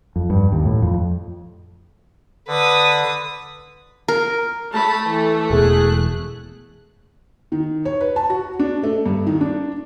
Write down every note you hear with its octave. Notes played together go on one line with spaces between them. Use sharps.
F2
G2
D#2
A2
F2
D3 B4 D#6
A#4
A3 A5 B5
E3 A4
E1 E2 G#4 F#6
D#3
C#5
B4
A5
F#4
D4
A3
G2
D#3
D4